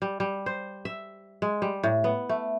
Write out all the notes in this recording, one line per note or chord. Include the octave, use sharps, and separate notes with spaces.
G3
G3
C5
E5
G#3
G3
A2
B3
A3